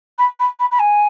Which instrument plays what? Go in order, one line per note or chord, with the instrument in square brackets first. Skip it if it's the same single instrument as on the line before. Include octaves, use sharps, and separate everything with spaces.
[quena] B5
B5
B5
B5
G#5